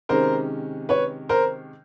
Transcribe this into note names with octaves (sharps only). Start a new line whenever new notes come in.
C3 D#3 G#3 C#4 A#4 C5
B4 C#5
A#4 C5